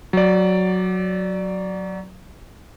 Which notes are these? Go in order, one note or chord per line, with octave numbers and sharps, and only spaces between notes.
F#3 D5